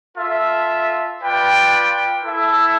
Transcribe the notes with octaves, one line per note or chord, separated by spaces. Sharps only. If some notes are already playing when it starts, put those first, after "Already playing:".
F4 A4 E5
F4 B4 D5 G5
E4 A4 E5